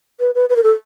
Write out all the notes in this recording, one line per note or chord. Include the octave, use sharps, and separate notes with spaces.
B4
B4
B4
A#4
A4